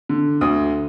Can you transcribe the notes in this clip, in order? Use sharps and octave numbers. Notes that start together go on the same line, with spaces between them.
D3
D2 D#6